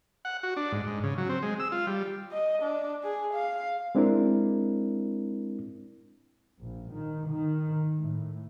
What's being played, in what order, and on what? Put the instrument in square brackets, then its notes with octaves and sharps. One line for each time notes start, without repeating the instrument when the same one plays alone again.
[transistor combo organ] F#5
F#4
D4
G#2
G#2
C#3
F#3
C4
G#3
E6
F4
G3
[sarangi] D#5
D4
G#4
F5
[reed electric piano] G#3 C4 D4 E4 A#4
[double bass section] A#1
D#3
D#3
A2